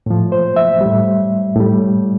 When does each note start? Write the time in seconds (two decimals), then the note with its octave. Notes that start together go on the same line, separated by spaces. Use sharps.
0.06 A2 F3
0.32 C5
0.56 E5
0.81 A2 G3
1.56 A2 G3